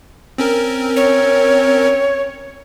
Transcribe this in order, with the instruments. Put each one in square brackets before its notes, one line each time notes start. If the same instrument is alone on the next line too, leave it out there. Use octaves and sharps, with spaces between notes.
[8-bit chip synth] C4 C#4 A#4
[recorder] C#5